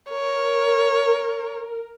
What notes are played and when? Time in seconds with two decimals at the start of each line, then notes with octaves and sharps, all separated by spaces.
0.10 A#4 C#5